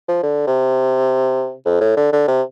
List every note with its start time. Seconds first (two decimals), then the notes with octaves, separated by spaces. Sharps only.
0.08 F3
0.23 D3
0.47 C3
1.66 F2
1.81 A2
1.97 D3
2.13 D3
2.28 C3